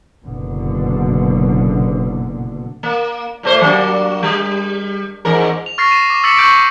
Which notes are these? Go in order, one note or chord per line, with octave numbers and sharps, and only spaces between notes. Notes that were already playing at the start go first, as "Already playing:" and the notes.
F#1 B2 D3
A#3
A#2 A3 C5
F#3 A#3 D4
G3
E2 G#2 A#4
F7
C#6 F6 A6 A#6 C7
C7 D#7 E7
D6
D6 E6 A6 B6 C#7 F#7
C#6 F6 G6 C#7 D7 F#7